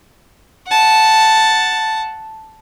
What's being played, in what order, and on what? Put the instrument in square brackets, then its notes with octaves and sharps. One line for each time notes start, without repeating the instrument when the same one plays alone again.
[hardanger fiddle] F#5 A5